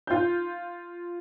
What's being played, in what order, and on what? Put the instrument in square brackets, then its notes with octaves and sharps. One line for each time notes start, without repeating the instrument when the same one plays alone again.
[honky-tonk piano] F4 G6